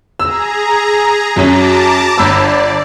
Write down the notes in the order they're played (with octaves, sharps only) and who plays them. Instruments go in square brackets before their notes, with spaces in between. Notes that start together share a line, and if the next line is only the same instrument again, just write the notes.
[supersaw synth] G#4 A#5 [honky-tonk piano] E6
[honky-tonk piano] F#2 F#3 C#4 [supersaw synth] A5 A#5 D6
[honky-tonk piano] G1 B5 E6 [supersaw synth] D5